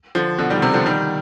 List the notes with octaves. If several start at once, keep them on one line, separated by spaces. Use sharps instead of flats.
D3 F3
B2 D3
D#3 G3
C3 D#3
D3 F3
D#3 G3